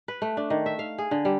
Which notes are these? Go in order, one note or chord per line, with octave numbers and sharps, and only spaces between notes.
B4
A3
D4
D#3
E5
F5
G#4
D3
G3